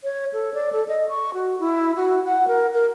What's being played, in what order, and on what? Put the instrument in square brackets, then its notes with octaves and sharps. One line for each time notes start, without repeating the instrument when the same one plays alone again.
[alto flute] C#5
A4
D5
A4
D#5
C#6
F#4
E4
F#4
F#5
A#4
A#4